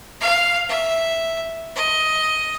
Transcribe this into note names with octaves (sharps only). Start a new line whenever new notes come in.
F5
E5
D#5